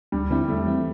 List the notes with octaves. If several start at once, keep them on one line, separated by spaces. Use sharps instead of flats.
D2 G3
D3 G3 C4 E4
E2 A3
E3 G3 C4 E4